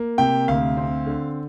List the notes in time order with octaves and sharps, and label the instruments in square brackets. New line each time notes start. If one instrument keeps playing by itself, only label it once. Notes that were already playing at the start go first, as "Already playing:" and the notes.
Already playing: [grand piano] A#3
C3 G5
D2 F5
C4
D3